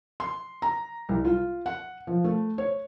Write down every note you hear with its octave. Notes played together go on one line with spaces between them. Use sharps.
C6
A#5
C2
F4
F#5
F3
A3
C#5